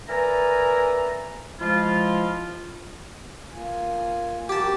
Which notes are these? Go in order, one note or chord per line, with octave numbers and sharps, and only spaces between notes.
A#4 B4 D5 E5 G#5 A#5
F3 G#3 E4 F4
A#3 F4 G#5
F2 F#4 G4 A#4 A5